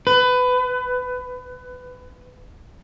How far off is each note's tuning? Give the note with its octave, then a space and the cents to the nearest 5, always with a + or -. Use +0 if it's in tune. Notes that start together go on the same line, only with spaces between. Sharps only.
B4 +20